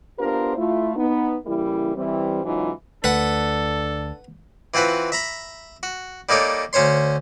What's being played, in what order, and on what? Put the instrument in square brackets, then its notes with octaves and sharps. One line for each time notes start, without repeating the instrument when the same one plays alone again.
[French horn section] B3 D4 F4 G4 A#4 C5
A3 E4 F4
B3 D#4
C#3 E3 G3 A#3 E4
E3 G3 C4
G#2 C#3 E3 F#3 D#4 F4
[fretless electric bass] D2 A3 [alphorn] D4 [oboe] A4 [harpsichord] B4 F#5
[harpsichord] E3 C4 F4 F#4 B4
E5 A#5 B5
F#4
G3 A#3 D#4 A4 C#5
D2 C#4 C5 C#5 C6